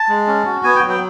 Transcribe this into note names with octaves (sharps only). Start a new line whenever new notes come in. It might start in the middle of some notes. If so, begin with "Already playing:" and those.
Already playing: A5
G#3
C#4
F#4
B3 G#5
G5
F#3
G5